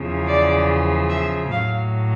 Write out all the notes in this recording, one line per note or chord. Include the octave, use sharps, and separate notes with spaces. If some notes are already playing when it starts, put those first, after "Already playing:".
Already playing: E2 C#3 F3
D5
E5
A2 F#3 F5